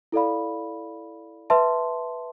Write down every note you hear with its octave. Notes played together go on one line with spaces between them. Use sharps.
E4 A4 D5 F5 B5
B4 E5 A5 C6